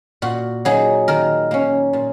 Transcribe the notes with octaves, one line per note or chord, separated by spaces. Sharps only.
A#2 F#4
F#3 A#3 D#4 G#4
D#3 A#4
A#3 C#4
A#2